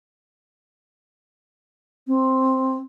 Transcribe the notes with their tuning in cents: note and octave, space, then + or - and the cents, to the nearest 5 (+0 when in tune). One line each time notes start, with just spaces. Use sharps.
C4 +5